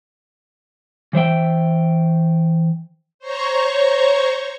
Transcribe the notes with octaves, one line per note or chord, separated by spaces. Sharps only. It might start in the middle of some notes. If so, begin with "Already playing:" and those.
E3 C5 E5 G5
C5 C#5 A#5 C#6